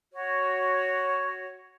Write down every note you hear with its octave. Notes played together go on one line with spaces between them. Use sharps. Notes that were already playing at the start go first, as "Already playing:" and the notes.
F#4 C#5